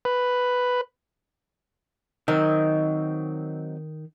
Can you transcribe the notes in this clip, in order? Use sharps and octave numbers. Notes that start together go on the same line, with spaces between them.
B4
D#3 F#3 C4 D#5